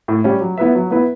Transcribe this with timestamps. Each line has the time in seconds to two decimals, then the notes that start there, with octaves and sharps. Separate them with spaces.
0.08 A2
0.24 G3 C#4 G4
0.41 F#3
0.58 B3 E4 B4 E5
0.75 F#3
0.91 B3 E4 B4 E5